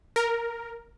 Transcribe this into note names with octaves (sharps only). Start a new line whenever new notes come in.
A#4